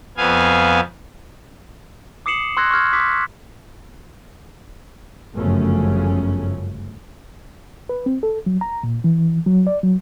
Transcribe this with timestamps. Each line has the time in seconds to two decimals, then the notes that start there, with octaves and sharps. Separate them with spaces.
0.17 F2 B3 F5 G#5
2.26 D6 D#6 C7 C#7 E7 F#7
2.57 C6 E6 F#6 G#6 A#6
2.71 C#6 E6 F6 G#6
2.93 C6 D6 E6 B6
5.34 G1 F#2 C#3 F3 A3 C#4
7.89 B4
8.06 C4
8.23 A4
8.46 F#3
8.61 A#5
8.83 A#2
9.04 E3
9.46 F#3
9.67 D5
9.83 F#3